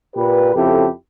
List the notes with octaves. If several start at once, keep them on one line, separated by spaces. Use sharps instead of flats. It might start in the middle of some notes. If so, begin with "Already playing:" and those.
A#2 G4 B4
F2 C#3 E4 G4 A4